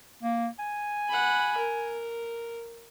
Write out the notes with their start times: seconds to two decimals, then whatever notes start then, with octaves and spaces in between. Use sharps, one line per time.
0.23 A#3
0.59 G#5
1.09 F#5 B5
1.57 A#4